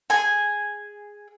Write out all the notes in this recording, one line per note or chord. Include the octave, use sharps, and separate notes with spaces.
G#4 G#5